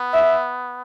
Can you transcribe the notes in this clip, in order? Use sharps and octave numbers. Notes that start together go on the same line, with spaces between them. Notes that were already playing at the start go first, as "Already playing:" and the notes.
Already playing: B3
E5